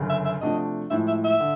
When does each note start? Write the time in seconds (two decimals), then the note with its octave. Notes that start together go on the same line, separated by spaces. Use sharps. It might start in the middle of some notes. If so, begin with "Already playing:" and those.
Already playing: G1 F#2 C#3
0.09 E5
0.25 E5
0.41 C3 F3 A3 D4 F#4 D#5
0.90 A2 F3 G#3 E5
1.08 E5
1.24 E5
1.40 D3